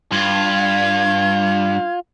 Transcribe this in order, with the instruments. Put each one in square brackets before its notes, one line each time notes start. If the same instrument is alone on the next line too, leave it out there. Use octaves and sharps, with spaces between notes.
[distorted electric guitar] G2 [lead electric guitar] F4 [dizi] G#6